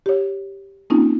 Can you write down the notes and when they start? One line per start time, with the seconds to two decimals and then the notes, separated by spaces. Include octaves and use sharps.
0.06 G4 C#5
0.90 A#3 C4 C#4 D#4 F4